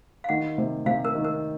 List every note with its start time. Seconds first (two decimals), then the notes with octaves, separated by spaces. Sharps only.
0.24 F5
0.29 D#3 F#5
0.58 C3
0.86 C3 F5
1.05 A#4
1.15 D#3
1.24 A#4